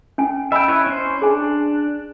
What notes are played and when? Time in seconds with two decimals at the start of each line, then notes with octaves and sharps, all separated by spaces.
0.18 C#4 G#5
0.52 D#5 E5 G5 G#5 B5
0.68 E4 B4 C#5
0.87 C#4 C5
1.22 D4 G#4 G#5